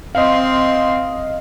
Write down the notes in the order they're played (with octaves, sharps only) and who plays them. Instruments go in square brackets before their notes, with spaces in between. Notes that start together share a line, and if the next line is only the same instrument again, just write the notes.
[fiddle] C4 C6 [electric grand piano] D#5 F5